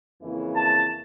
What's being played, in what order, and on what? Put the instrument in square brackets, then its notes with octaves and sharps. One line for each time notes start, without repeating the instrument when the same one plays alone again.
[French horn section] F2 C#3 E3 A#3 E4
[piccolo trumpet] A5